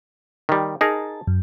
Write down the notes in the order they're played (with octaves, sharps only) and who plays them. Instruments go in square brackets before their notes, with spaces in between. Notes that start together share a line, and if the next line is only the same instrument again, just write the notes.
[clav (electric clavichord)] D#3 G3
[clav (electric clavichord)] D#4 G#4 A#4 [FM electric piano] A5
[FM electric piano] F#2